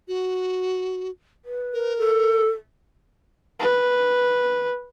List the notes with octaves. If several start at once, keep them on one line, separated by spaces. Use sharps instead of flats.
F#4
B4
A#4
A4
B4